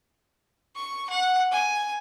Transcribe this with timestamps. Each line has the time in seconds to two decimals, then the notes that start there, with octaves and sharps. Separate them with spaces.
0.76 C#6
1.10 F#5
1.51 G#5